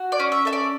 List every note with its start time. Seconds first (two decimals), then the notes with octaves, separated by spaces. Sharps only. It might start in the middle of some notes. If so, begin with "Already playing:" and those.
Already playing: F#4
0.12 D5
0.20 C#4
0.32 E5
0.45 A4 E5
0.53 D5